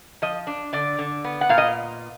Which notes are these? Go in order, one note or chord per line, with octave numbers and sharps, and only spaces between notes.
F3 D#5
D4
D3 D5
D3
B3
F#5
A#2 F5
D#5